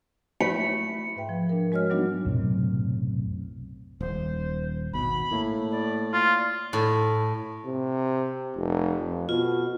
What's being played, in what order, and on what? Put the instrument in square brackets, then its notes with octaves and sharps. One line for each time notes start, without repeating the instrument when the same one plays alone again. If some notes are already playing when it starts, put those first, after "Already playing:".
[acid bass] A3 [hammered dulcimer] B5 [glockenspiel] C#7
[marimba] G#2 B4 E5 G5
F3
D4 A#4
G#3 F#4 C#5 D#5 F6
F#3 G3 B3 D4 D#4 F#4
[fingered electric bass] B1 F#2 A2 C3
[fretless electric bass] D#1 [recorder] C5
[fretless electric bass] G#1 B2 [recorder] B5
[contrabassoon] A2 [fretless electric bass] A#3
[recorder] D5
[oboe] F4
[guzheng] A2
[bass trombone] C3
F1
F2
[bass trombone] B2 [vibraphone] F4